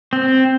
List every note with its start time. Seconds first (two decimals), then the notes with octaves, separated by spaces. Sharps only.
0.13 C4